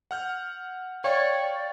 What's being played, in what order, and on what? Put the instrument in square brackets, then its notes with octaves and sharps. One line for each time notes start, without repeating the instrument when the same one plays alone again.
[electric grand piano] F#5 F6 G6
[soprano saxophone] C#5 [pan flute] D5 [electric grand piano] F5 G5 C#6